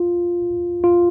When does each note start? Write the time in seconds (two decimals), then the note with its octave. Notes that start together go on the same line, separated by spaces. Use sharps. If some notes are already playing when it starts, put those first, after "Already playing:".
Already playing: F4
0.84 F4